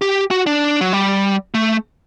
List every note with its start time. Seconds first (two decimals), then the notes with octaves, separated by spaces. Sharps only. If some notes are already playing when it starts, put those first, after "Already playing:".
0.02 G4
0.31 F#4
0.46 D4
0.81 F#3
0.93 G3
1.54 A3